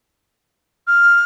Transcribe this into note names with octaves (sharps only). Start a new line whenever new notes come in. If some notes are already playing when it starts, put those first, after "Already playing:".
F6